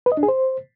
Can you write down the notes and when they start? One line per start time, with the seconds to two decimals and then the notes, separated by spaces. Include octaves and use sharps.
0.06 B4
0.12 D#5
0.17 D4
0.23 G#4
0.28 C5